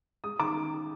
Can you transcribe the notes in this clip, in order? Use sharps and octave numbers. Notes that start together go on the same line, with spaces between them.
G#3 D#6
D#3 D6